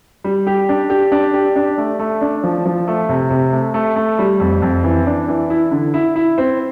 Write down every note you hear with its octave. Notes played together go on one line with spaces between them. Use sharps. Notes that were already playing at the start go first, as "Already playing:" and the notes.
G3
G4
D4
G4
D4
G4
D4
A3
A3
D4
F3
F3
A3
C3
C3
A3
A3
A3
G3
F2
F2
E3
D4
E3
E4
D3
E4
E4
C4